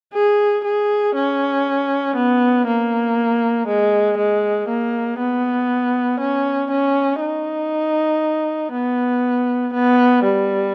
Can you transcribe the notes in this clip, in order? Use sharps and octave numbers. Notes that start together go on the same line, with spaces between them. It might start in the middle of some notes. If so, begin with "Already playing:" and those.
G#4
G#4
C#4
B3
A#3
G#3
G#3
A#3
B3
C#4
C#4
D#4
B3
B3
G3